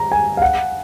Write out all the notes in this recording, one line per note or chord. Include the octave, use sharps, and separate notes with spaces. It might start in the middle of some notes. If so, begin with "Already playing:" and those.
Already playing: A#5
G#5
F5
F#5